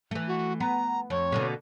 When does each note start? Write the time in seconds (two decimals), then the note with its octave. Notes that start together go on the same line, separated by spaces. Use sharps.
0.11 E3 A3
0.28 F#4
0.60 B3 A#5
1.10 F2 C#5
1.32 B2 D3 A#3